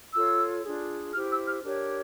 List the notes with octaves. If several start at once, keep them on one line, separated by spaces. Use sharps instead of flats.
F4 A4 C#5 E6
D4 F4 G#4
E4 G4 C5 F6
E6
F6
D4 G4 A#4 C#5